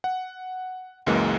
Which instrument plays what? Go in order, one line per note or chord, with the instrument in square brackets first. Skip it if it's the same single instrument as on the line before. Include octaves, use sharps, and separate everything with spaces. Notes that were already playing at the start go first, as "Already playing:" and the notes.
[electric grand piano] F#5
C#2 F#2 E3 G#3 A#3